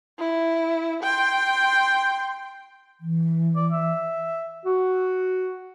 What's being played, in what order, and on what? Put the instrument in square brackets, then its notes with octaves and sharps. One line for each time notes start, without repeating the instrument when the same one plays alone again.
[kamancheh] E4
G5 C6
[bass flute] E3
[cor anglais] D5
E5
[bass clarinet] F#4